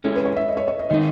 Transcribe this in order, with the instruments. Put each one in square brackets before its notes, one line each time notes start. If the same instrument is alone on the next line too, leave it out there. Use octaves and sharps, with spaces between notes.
[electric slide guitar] G#3 C#4 E4 [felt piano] A4
[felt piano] B4
C#5
E5
D#5
C#5
C#5
D#5
[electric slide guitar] D#3 G#3 D#4 [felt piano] D#5